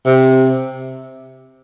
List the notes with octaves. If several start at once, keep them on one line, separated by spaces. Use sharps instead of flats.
C3